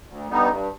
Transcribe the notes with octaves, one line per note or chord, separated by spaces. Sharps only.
D2
D3 G3 B3 D#4
G2